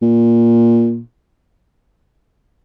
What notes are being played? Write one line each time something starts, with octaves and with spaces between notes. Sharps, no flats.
A#2